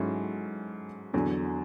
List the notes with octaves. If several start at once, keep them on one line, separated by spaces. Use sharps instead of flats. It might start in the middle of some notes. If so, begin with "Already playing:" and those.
Already playing: G#2 F#3 C#4 E4 A4
E2 D3 F#3